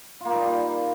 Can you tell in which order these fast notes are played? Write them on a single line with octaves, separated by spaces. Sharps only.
F4 A#3 D#4 G3